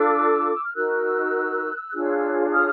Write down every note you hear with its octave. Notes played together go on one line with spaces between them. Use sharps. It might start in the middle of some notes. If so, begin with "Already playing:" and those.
Already playing: D4 F4 A4 D6 E6
E6
F6
D#4 F#4 A#4 E6 F#6
D4 F4 G#4 C#5
D#6 F6